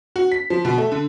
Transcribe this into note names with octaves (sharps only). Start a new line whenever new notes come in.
F#4
B6
F3
B2
A3
D3